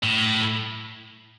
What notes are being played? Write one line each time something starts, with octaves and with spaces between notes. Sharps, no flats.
A2